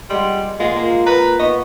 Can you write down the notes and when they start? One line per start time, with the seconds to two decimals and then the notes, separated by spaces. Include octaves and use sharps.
0.10 G3 G#3 F#5
0.60 A#2 G#3 F4 F#5
0.76 A#3
1.06 B4 A#5
1.39 B3 D#5 C#6